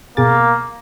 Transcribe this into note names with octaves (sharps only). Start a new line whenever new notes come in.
B2 A#3 G#4 A6